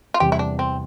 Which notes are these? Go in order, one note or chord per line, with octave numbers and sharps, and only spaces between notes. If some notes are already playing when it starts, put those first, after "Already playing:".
F4
E2 C3 G3 G4
E4
D4
C4